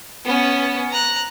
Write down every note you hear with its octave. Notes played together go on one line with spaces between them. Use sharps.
B3 C#4
A#5 F#6